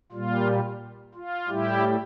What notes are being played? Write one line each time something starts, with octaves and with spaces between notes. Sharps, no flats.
A#2 G3 F4
F4
A2 G3 E4 G4